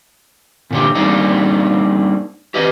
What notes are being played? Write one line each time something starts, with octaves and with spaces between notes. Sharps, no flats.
A#2 D3 G4
G3 A#3 C4 D4 D#4
G4 B4 D#5